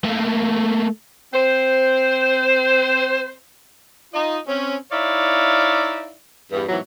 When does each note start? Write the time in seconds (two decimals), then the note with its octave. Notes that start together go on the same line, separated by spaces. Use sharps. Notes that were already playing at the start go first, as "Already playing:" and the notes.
0.04 A3 A#3
1.34 C4 C5
4.14 D#4 F4 D#5
4.48 C4 C#4
4.92 D#4 E4 C#5 D5 E5 F5
6.52 E2 G2
6.69 G#2 B2 E3 F#3